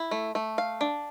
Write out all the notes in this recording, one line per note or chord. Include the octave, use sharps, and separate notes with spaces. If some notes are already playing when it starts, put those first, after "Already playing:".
Already playing: E4
A3
A3
F5
D4